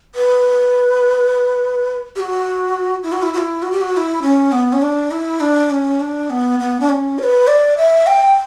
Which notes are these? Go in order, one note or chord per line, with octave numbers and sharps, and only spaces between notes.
B4
G4
F#4
E4
F#4
E4
F#4
E4
F#4
G4
F#4
F#4
E4
C#4
B3
C#4
D4
E4
D4
C#4
D4
B3
B3
D4
C#4
C#5
B4
D5
E5
G5